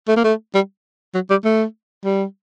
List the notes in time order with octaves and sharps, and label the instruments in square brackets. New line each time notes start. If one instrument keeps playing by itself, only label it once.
[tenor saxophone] A3
A#3
A3
G3
F#3
G3
A3
G3